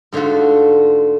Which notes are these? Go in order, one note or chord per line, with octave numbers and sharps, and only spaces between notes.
G#2 D3 A3 F4 F#4